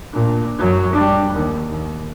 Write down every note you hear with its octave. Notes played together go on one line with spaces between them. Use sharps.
A#2 D4
F#2 F#3
G3 D4
D#2
D#2